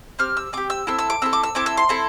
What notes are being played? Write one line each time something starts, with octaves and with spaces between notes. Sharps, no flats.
C4 G4 F6
E6
C4 G4 D6
E6
C4 E4 A4 E6
E6
D6
C4 E4 A4 E6
D6
E6
C4 E4 A4 D6
E6
C6
C4 E4 A4